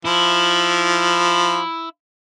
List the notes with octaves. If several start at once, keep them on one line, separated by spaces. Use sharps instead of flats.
F3 E4